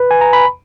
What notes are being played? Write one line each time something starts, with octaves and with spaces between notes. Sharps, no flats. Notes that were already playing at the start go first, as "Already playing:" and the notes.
Already playing: B4
G#5
A#5
B5